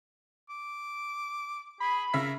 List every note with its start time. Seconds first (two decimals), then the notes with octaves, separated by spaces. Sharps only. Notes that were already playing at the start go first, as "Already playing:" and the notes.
0.49 D6
1.80 G#4 B5
2.14 C#3 A#4 E5 B6